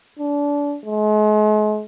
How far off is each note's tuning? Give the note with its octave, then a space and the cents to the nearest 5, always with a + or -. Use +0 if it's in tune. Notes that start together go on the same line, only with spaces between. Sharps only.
D4 -30
G#3 +40